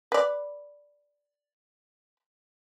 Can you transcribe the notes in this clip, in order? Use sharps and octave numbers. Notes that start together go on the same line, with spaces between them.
B4 D5